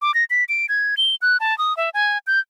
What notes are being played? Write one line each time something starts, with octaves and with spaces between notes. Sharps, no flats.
D6
A#6
B6
D7
G#6
G7
F#6
A5
D#6
E5
G#5
G6